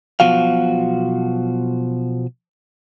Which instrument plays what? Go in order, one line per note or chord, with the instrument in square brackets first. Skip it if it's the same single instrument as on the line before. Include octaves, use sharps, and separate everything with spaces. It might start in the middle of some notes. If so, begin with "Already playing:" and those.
[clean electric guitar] B1 B2 F3 F#4 F5